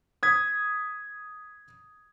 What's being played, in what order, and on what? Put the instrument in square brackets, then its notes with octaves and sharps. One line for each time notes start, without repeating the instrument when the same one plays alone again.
[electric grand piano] D#6 G#6 B6